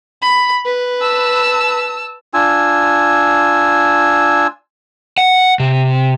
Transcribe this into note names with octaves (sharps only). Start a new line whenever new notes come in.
B5
B4
A5 E6
D4 F4 G#5 E6
F#5
C3